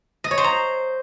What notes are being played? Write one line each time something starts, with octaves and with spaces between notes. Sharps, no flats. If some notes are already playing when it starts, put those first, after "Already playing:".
D#5
C#5
C5
A#5